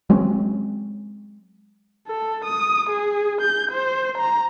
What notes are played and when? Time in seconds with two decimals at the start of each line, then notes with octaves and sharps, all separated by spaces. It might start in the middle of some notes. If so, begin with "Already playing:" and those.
0.10 F#3 G#3 C4 C#4
2.08 A4
2.45 D#6
2.90 G#4
3.41 G6
3.72 C5
4.18 A#5